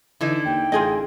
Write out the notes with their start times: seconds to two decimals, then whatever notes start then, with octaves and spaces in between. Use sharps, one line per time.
0.21 D3 E3 D#4 E4
0.45 D#2 G5
0.72 A1 F4 G#4 D#5